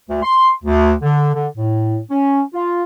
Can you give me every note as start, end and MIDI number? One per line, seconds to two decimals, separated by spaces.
0.09 0.19 38
0.23 0.50 84
0.64 0.93 38
1.02 1.32 50
1.34 1.48 50
1.56 1.99 45
2.10 2.41 61
2.54 2.83 65